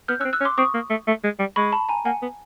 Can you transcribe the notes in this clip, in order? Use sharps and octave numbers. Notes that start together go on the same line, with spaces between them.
B3 F6 G6
C#4 E6 F#6
C4
E6 F#6
C#4
C6 D6
C4 C#6 D#6
A#3
A3
A3
G#3
G3
G#3 B5 C#6
A5 B5
G#5 A#5
A#3 F#5 G#5
B3